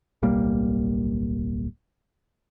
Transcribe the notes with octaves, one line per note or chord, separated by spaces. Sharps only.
D1 B1 G3 A#3